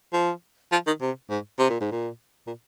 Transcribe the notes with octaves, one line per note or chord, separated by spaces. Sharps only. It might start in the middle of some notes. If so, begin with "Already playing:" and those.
F3
F3
D#3
C3
G#2
C3
A#2
G#2
A#2
A#2